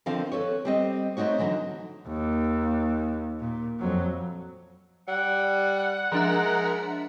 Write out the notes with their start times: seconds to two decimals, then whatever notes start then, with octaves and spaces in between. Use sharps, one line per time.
0.06 D3 D#3 F3 C4 F5
0.32 A4 B4 C#5
0.65 G3 C4 D#5
1.17 A3 C4 D4 D#4 F#4 C#5
1.39 D3 E3 F#3 D#4
2.08 D#2
3.40 A#2
3.79 F2 F#3
5.08 G3 F#5
6.12 F3 G#3 D4 A#4 E5